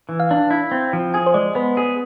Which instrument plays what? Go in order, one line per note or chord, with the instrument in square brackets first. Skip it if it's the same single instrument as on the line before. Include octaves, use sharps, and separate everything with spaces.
[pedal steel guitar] E3
[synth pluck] F5
[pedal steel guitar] D4
E4
C4
F3
[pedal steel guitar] G#4 [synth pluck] G#5
[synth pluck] C5
[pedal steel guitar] G#3 [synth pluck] D5
[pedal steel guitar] B3 [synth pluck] B4
[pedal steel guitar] G#4